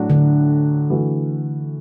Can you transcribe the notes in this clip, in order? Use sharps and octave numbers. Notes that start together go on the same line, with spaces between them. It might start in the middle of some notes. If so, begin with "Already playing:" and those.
Already playing: A2 F#3 D4 F#4
D3
E3 A3 F#4